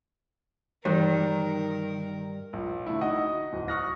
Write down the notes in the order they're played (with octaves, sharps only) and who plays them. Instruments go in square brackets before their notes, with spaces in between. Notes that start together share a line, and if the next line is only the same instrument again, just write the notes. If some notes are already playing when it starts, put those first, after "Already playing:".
[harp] G2 [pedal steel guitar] D#3 [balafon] E3 [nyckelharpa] A#4
[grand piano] A#1
D3 A3 E4
D#4 F#4 D#5 F#5
D1
C#6 D#6 F6 F#6 A#6